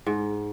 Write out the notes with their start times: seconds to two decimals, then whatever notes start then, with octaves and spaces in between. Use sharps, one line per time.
0.06 G#2